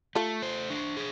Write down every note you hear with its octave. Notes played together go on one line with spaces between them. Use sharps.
A3 F4 A4
C5
D4
G#4